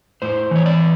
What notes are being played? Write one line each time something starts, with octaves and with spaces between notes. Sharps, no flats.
A2 C5
E3 C#5
D5